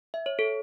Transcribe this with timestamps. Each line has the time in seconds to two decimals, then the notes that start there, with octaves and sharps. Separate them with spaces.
0.14 E5
0.26 C#5
0.39 A4